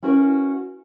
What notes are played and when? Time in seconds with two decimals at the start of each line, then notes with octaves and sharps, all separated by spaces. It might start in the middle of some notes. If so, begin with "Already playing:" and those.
0.03 C#4 E4 F#4 A#4 B4